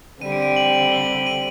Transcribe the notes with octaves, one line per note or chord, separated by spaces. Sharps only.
D3 G3 C4 D#7
D7
D#7
F#7
G7
D#7